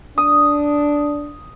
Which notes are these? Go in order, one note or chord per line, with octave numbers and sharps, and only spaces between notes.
D4 D#6